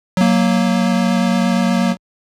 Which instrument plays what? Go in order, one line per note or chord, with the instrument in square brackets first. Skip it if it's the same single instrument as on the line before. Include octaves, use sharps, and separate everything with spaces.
[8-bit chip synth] F#3 A#3